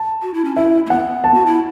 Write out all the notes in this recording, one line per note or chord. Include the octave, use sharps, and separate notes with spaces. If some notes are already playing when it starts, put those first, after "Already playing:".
Already playing: A5
F#4
E4
C#4
E4 E5
A3
B3 F#5
A5
F#4
E4